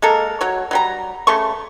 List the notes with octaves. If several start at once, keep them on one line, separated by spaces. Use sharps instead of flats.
G#3 A#3 A4 A#4
F#3 C#5
F#3 G3 A#5
C#3 A3 C6 C#6